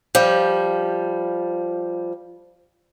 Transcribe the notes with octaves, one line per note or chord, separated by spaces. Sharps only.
F3 G3